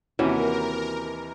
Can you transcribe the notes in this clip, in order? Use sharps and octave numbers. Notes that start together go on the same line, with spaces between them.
D#2 C3 E3 C#4 F#4 A#4